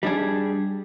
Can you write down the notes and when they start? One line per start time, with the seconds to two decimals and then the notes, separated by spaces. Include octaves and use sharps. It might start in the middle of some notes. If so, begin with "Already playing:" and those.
0.03 G3 D4 G#4